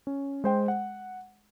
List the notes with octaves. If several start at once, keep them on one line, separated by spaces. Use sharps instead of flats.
C#4
G#3 C5 G5
F#5